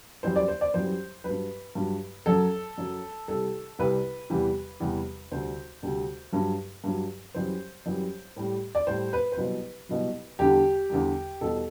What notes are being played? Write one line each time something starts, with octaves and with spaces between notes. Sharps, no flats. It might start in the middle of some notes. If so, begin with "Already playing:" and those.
F#2 E3 G3 C5
D5
C5
D5
F#2 E3 G3 C5
G2 F#3 B4
G2 F#3
F#2 F#3 A4
F#2 F#3
C2 C3 G3 A4
C2 C3 G3 B4
E2 C3 E3 G3
E2 C3 E3 G3
D2 C3 G3 C5
D2 C3 G3
G2 F#3
G2 F#3
F#2 E3 G3 C5
F#2 E3 G3
A2 G3
D5
A2 G3 C5
B4
C5
C2 B2 F#3 B4
C2 B2 F#3
E2 D3 G3 G4
E2 D3 G3
E2 B2 G3 A4